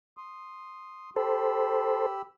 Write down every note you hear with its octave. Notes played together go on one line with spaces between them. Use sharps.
C6 D#6
G4 A4 C5 B5 E6